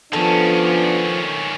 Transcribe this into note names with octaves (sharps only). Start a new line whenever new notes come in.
D#3 F3 B3 C#4 D4 A4